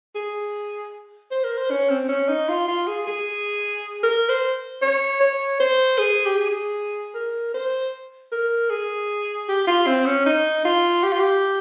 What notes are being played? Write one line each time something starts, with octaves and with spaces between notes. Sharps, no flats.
G#4
C5
A#4
C5
C#4
C4
C#4
D#4
F4
F4
G#4
G#4
A#4
C5
C#5
C#5
C5
G#4
G4
G#4
A#4
C5
A#4
G#4
G4
F4
C4
C#4
D#4
F4
G4
F4
G4